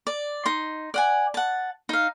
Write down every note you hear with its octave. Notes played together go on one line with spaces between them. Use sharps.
D5
D#4 C6
D5 F#5 G#5
F#5 A5
D#4 F5